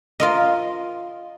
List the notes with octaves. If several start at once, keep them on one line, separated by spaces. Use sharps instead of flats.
F4 A#4 D#5